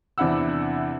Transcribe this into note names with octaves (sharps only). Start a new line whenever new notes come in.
E2 C3 D4 E4 F#5 E6